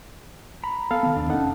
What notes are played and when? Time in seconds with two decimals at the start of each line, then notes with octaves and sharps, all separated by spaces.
0.64 A#5 B5
0.91 B3 A4 F5
1.03 D#3 B3
1.16 E2 D4
1.30 F1 C4 C#4 D#4 A4 F#5